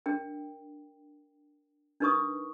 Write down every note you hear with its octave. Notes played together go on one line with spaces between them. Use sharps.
D4 A#4 G5
D4 D#4 A#4 B4 C#6 D#6